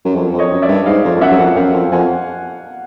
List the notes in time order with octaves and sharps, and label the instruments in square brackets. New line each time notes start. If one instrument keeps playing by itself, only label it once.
[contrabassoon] F#2
F2
F2
[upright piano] C#5 D#5
[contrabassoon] F#2
[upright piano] D5 E5
[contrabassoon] G2
[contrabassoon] G#2 [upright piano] D#5 F5
[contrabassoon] F2
F2
[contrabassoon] F#2 [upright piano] E5 F#5
[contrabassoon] F#2
F2
[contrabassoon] F#2 [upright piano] F5 G5
[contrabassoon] F2
[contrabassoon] F2 [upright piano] F#5 G#5